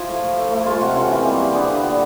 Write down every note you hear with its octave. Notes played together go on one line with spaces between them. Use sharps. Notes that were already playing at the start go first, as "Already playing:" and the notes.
Already playing: F3 E4
A3
A3
A3
A3
G#3 F4
C3 F#4
E3 C#4
E3 C4
G3 A#3
G3 A#3
D3 B3
D3
A#2